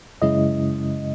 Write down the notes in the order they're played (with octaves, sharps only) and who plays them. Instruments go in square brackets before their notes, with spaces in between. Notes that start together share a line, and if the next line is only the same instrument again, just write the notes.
[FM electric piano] F#2 C#3 G#3 C#4 E4 D#5